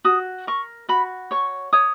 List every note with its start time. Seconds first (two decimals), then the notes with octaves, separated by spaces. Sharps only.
0.05 F#4 D#6
0.47 A#4 C#6
0.89 F#4 B5
1.31 C#5 C#6
1.73 C#5 D#6